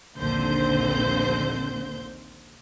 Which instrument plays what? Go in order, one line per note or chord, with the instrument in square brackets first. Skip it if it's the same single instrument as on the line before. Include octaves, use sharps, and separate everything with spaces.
[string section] A#1 D#2 D3 C4 C5 G6